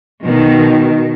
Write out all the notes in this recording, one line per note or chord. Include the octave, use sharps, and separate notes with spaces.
B2 D#3